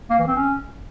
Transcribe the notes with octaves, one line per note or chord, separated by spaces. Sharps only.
A#3
E3
C4
C#4